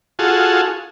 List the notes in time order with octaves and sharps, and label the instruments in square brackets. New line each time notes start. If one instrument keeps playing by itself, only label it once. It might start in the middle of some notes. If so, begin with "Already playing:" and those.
[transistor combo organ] F4 F#4 G#4 A4